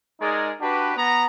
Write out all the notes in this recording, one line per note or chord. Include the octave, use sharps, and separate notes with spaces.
G#3 D#4 G#4 A#4 D5
D4 F#4 G4 B4
B3 A#5